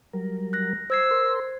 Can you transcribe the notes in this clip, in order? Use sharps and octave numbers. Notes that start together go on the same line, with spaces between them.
F#3 G3 A#4
F#6 A#6
C5 E6 G#6 C7
A#4 C6